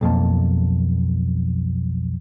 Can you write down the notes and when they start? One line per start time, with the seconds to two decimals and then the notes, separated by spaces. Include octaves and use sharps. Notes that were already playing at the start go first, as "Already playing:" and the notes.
0.01 B1 F2 A#3 A5